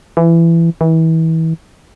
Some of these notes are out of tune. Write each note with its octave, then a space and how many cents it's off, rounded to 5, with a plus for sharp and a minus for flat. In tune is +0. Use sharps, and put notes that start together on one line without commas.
E3 +20
E3 -30